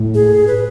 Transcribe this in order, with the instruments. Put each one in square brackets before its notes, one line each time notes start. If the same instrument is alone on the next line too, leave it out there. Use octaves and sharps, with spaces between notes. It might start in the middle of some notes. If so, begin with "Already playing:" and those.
Already playing: [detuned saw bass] A2
[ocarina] G#4
B4